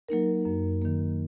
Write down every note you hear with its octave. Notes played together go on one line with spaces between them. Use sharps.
F#3 A#3 D#4 A#4
F#2
D#3 A#3